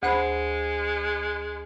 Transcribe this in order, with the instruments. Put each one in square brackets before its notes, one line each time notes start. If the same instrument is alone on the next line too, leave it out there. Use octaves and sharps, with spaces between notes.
[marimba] D2 C5 B5 [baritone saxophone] G#3